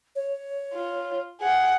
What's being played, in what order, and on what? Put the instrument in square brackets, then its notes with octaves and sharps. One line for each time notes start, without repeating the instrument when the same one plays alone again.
[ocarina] C#5
[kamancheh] F4
G#4 F#5